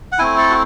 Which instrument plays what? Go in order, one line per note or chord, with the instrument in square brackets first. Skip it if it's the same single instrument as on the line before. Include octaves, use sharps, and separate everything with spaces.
[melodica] F#5
A3 C4 E4 G#5
A4
F#4